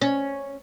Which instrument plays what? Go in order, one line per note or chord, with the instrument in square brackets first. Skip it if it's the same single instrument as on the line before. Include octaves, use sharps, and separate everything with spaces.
[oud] C#4